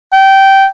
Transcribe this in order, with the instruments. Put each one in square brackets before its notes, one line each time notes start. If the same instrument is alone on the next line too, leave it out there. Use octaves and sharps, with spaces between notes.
[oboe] G5